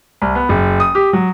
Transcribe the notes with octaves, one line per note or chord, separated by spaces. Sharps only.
C2
B3
F#1
D#6
G4
F#3